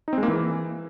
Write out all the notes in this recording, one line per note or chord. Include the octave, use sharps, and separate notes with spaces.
D#4
C4
G#3
A#3
E3